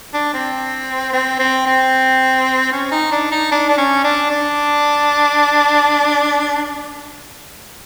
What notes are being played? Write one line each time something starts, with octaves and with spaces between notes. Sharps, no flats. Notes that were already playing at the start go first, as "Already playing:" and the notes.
D4
C4
C4
C4
C4
C#4
D#4
D4
D#4
D4
D4
C#4
D4
D4